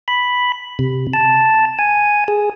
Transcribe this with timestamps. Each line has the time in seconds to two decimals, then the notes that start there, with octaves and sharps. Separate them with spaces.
0.08 B5
0.79 C3
1.14 A5
1.79 G#5
2.28 G#4